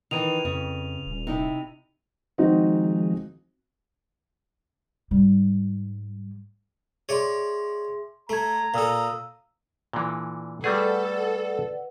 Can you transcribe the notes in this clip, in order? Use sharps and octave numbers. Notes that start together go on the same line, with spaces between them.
D#3 E3 D#7 F7
F2 C#3
D#1
C3 D#4 E4
D#3 F3 G#3 C4 D#4 F#4
G#2 G3
G#4 C#5 D5 E5 C6
A3 A5 A#5 G#6
A#2 A4 F5 D#6 E6
A#2 D3 E3
G3 A3 G#4 A4 B4 D5 F#5